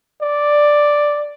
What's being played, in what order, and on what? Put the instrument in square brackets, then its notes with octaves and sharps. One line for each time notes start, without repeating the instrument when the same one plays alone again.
[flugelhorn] D5